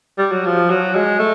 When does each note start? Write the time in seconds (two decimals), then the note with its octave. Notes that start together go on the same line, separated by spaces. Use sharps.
0.18 G3
0.32 F#3
0.46 F3
0.70 F#3
0.95 G#3
1.19 A3